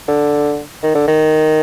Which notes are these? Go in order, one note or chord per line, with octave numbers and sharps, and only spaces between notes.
D3
D#3
D3
D#3